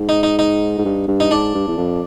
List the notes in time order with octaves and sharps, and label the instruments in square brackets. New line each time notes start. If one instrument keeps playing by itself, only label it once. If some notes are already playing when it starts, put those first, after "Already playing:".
Already playing: [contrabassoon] G#2
[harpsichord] D#4
D#4
D#4
[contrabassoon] G#2
G2
G2
[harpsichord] D#4
[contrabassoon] G#2 [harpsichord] D4
[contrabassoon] G2
E2
F2